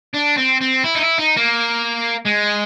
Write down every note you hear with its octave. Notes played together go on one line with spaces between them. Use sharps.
D4
C4
C4
E4
D#4
E4
D#4
A#3
G#3